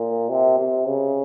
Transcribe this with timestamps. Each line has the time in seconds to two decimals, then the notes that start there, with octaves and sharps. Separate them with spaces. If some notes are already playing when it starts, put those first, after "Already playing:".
Already playing: A#2
0.29 C3
0.58 C3
0.87 C#3